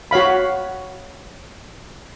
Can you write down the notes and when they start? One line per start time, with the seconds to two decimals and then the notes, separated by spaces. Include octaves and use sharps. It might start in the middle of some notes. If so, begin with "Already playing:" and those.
0.11 F#4 C#5 F5 B5